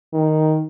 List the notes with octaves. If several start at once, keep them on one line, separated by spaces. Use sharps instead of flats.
D#3